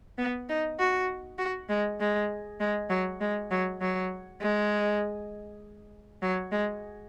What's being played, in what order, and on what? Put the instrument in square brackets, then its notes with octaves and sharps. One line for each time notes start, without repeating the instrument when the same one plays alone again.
[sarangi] B3
D#4
F#4
F#4
G#3
G#3
G#3
F#3
G#3
F#3
F#3
G#3
F#3
G#3